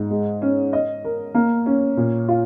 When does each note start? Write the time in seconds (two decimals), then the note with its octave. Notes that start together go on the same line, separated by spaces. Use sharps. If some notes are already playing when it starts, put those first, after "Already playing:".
Already playing: G#2
0.11 G#3
0.42 C#4
0.73 D#5
1.04 A#4
1.35 A#3
1.66 C#4
1.97 A#2
2.28 F4